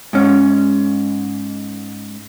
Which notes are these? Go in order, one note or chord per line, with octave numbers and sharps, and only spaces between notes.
G#2 C#4